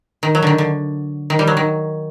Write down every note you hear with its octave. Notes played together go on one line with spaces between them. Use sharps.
D#3
F#3
D3 D#3
D3
D#3
G3
F#3
D#3